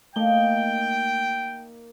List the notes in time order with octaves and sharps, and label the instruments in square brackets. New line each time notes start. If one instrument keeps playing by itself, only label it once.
[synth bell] A3 G7 [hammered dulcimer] A#3 D#4 [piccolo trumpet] G5